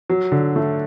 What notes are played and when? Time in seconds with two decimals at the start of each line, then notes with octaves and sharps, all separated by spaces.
0.10 F#3
0.32 D3
0.56 A3